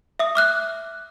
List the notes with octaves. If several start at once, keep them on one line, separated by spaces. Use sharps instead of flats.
E5 D#6
D6 F6 F#6